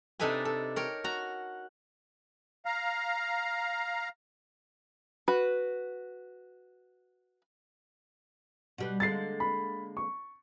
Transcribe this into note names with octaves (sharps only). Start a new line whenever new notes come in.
C3 D4 D#4 A4 B4 G#5
A4
A#4 C#5 G5
F#4 A#5
F5 A#5
F#4 B4
B2 G3 B4
D3 G#3 A#3 A6 C7
B5
C#6